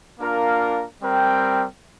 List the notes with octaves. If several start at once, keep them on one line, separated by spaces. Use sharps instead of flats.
A#3 D4 F4 A#4 F5
G3 C4 A#4 G5